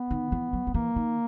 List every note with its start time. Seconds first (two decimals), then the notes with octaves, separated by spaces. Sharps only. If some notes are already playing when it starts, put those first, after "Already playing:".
Already playing: B3
0.11 D#3
0.32 E3
0.53 F#3
0.67 F#3
0.74 E3 A#3
0.96 D#3